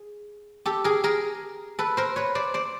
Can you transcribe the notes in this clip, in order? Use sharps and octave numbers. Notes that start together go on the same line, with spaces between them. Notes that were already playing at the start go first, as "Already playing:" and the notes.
Already playing: G#4
G4 A4
G#4 A#4
G#4 A#4
A4 B4
A#4 C5
B4 C#5
C5 D5
C5 D5